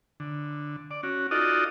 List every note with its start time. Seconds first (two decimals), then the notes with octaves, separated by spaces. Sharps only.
0.20 D3
0.91 D5
1.03 C#4 F#4
1.31 D#4 F4 F#4 A4 D5 D#5